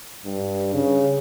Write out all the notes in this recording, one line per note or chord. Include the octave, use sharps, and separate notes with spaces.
G2
C#3